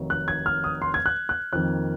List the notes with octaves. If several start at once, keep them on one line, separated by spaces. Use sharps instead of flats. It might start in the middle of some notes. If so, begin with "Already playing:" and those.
Already playing: F1 C3 D#3 F#3
F#6
G#6
F6
D#6
C6
G#6
F#6
F#6
F2 D#3 A#3 F#6